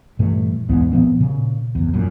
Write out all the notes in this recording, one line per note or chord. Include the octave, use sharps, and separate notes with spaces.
G2 A#2 E3 A3
E2 G#2 E3 B3
A#2 F3 B3 C4
A#2 C#3
F#1 E2
F#2 A#2